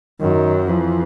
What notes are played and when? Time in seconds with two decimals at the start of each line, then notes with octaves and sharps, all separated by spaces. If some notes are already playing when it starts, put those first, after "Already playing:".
0.20 F#2 D#3
0.67 F2 E3